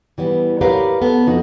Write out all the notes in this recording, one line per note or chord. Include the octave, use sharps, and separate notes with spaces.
E3 G3 B3
G4 A#4 B4 C#5 F5 F#5
B3 A4
F2 D#4 F#4 F#5